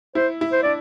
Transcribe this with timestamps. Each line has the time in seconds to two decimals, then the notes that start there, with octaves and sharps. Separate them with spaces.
0.15 E4 C5
0.41 E4
0.53 C5
0.63 D4 D5